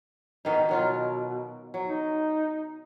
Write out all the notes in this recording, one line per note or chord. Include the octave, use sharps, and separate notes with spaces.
B2 D#3 D#4
B2 D#3 F#3 F4
F#3
D#4